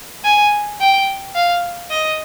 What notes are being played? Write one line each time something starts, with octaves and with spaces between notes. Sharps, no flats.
G#5
G5
F5
D#5